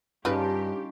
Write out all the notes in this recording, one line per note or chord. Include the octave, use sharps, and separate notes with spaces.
G2 C#3 C#4 D#4 F4 G4 B4